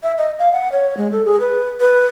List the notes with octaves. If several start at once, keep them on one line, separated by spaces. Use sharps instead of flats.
E5
D#5
F5
F#5
C#5
G#3
A4
G#4
B4
B4